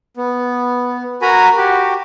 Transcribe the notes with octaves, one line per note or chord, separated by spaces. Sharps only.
B3
F#4 A#4 G#5 A#5 B5
F#4 G4